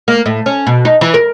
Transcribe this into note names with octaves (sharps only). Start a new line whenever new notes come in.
A#3
A2
C#4
B2
D#4
E3
A#4